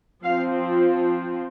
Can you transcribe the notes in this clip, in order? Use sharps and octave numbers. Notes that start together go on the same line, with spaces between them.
F3 C4 F5